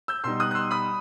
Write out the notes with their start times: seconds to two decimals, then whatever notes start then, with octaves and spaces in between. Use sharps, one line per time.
0.08 E6 G6
0.24 B2 G3 D#4 C6 E6
0.40 D#6 F#6
0.51 F#6
0.55 C6 E6
0.71 B5 D#6